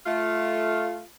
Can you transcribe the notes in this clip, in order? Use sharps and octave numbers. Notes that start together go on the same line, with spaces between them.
A3 F4